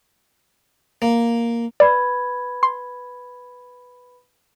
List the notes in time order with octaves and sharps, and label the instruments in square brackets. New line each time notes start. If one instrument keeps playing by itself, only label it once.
[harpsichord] A#3
[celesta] B4 B5 G#6 [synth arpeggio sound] D5
[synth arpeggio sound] C6